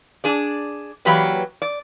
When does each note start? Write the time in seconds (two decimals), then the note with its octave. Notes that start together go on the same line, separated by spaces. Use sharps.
0.24 D4 G#4 D5
1.05 E3 F#3 A#3 G4 B4 D5
1.62 D5